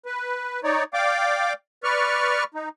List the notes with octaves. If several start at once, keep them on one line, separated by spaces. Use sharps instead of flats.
B4
D#4 C#5 D5
D5 F5 G5 D6
B4 D5 C#6 F6
D#4